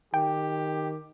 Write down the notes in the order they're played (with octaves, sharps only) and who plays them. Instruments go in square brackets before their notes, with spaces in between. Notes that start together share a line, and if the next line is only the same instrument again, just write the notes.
[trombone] D#3 [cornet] G4 [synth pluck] G5